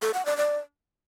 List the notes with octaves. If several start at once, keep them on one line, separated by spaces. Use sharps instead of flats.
A4
F#5
D5
D5